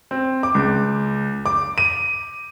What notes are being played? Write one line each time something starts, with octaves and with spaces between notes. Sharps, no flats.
C4
D6
C#2
D6
D#7